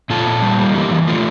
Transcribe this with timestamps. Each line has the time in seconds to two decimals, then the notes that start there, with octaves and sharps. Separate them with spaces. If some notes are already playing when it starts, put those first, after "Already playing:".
0.10 A#2 F4 A4
0.26 A#2
0.42 G3
0.59 A#3
0.74 E3 G4 A#4
0.91 E3
1.08 A3 F4 A4